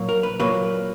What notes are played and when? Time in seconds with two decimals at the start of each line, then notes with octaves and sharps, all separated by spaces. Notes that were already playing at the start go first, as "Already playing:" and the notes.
Already playing: A#2 F#3 A#3
0.09 A#4
0.23 B4
0.40 A#2 F#3 A#3 B4